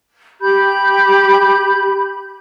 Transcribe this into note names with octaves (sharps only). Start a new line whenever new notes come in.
G4 B5 G6